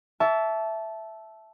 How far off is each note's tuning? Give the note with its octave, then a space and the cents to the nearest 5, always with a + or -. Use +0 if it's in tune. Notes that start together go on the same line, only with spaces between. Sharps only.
E5 +0 A5 -15 C#6 +40